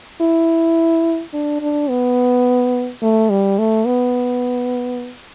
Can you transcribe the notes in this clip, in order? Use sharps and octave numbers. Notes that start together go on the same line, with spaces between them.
E4
D4
D4
B3
A3
G3
A3
B3